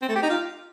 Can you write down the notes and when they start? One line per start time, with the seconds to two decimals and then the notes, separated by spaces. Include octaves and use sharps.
0.02 C4
0.09 A3
0.15 G4
0.22 D#4
0.29 F4